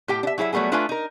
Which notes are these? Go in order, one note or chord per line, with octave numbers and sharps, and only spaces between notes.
A2 G4 G5
D4 E5
F#3 E4 G#4 C5 E5
F#3 G3 A3 B3 G#4
A3 D4 F4 B4 E5 G#5
D#4 A#4